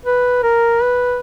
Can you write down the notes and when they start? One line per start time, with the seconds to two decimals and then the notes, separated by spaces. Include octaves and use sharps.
0.06 B4
0.43 A#4
0.82 B4